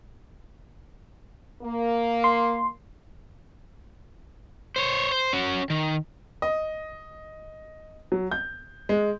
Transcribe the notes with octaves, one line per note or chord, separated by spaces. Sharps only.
A#3
C6
C5 C#5
C5
C#4 F#4
D#3
D#5
F#3
G6
G#3